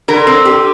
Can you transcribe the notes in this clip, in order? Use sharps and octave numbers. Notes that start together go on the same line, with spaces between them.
D3 A#4
C4
G4